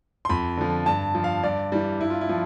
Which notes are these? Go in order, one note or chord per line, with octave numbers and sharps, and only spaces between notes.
C6
F2 B5
D3 F3
G2 A5
F3
F5
G2 D5
E3 G3
G2 E4
F4
E4
F3